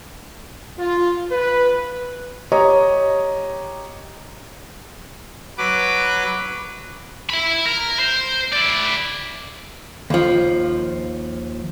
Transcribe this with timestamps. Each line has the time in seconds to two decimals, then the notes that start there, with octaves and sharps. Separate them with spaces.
0.78 F4
1.30 B4
2.52 G4 C#5 D#5 A#5 D#6
5.58 F#3 B4 D6
7.30 E5 B5
7.66 A#4
7.99 C5
8.53 E4 D5
10.10 D#2 F3